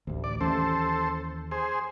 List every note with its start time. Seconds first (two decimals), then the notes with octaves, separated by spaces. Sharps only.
0.07 A1 D2
0.24 D5
0.41 D#2 E3 C#4 A4 C5
1.51 G#4 C5